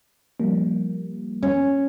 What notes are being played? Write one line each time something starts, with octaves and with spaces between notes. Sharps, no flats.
F3 G3 A#3
C#4